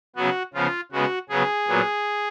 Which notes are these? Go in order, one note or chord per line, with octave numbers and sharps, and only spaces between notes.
C#3 F#3 B3 F#4
C#3 F3 B3 F4
C#3 G#3 B3 F#4
C#3 F#3 B3 G#4
A#2 F#3 B3